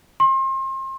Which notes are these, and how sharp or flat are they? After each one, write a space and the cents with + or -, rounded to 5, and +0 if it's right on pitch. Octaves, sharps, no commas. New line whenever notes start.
C6 +35